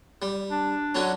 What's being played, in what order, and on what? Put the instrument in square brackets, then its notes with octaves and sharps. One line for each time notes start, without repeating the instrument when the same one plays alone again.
[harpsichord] G3
[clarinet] D4
[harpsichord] D3 F#3 C#4